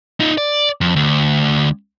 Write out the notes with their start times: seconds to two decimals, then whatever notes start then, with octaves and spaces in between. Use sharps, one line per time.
0.20 D#4 F4
0.38 D5
0.81 F2
0.96 D2